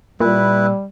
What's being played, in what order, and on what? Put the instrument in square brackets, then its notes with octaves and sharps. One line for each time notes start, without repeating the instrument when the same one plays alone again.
[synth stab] A#2 [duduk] G3 [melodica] E4 B4